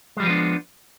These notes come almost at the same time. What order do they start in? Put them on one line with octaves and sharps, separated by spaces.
G#3 G3 F3 B3 D4